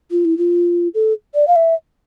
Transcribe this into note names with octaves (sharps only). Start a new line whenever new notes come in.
F4
E4
F4
A4
D5
F5
E5